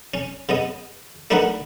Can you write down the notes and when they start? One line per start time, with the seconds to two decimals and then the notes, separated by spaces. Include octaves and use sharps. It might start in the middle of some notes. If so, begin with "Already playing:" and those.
0.14 C#4
0.49 C#3 B3 D#5
1.30 A3 D4 D#4 A#4 B4 F#5